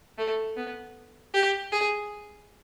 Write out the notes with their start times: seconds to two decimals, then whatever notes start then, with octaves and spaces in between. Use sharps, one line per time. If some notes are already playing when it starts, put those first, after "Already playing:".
0.18 A3
0.57 B3
1.34 G4
1.72 G#4